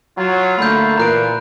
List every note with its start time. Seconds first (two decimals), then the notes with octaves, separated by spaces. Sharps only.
0.18 F#3 F4
0.58 D3 A3 A#3 B5 G6
0.97 A#2 E3 A#5 F#6 D7